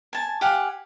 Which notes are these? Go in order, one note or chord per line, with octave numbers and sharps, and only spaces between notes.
G#5 A5
G4 F5 F#5 G#5